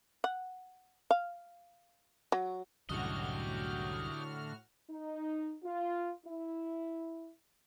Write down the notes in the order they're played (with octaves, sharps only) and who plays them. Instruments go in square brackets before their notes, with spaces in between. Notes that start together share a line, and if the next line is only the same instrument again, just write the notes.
[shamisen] F#5
F5
F#3
[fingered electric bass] C2 F#2 [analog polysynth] A2 F#4 F6 [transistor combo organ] D3 [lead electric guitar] G4 D#5
[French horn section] D#4
F4
E4